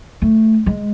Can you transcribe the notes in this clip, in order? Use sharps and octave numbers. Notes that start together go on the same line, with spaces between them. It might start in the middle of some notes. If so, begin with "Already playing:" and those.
A3
G#3